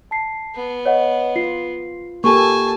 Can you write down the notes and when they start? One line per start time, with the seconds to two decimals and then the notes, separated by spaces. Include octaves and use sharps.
0.11 A5 C7
0.55 B3
0.86 C#5 D#5 F#5
1.36 F4 C7
2.24 A#3 G4 A4 G#5 A5 C#6